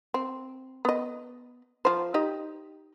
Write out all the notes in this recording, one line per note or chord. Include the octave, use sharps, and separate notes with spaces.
C4
B3 D#5
F3 C5
D#4 G4 D#5